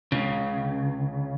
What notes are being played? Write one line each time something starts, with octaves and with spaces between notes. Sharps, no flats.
C#2 C#3